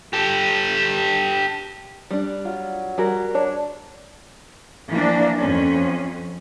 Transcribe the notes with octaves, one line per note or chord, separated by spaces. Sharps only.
G4 A4
G3 D4
F#3 F4
G3 F#4 G#4 A#4
D4 C#5
E3 F3 A#3 D4
F2 C#4